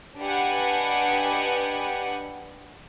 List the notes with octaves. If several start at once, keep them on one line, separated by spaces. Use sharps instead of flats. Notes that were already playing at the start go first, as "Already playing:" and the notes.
D4 G4 B4 D#5 F#5 G#5